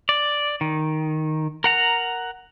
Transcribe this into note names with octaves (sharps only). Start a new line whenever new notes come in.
D5
D#3
A#4 F#5 A#5